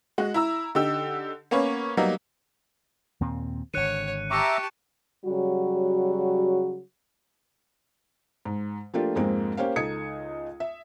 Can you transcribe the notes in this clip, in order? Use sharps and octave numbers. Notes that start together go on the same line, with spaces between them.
G#3 F#4
E4 A#5 E6
D3 D#4 G4 E6
A#3 B3 C#4 B4 C#5
F#3 G3 A#3 B3 D#4
D#2 A#2 C4
G#1 D3 C#5 F#6 C#7 D#7
G4 E5 A5 A#5 C#6 D6 C#7
C#3 F#3 G3 F#4
G#2
F3 A3 A#3 D4 F4 G4
F2 G#2 G#3 A#3 C4
A#3 C#4 G4 C5 F5
C#2 D#4 A4 D#6 G#6 C#7
E5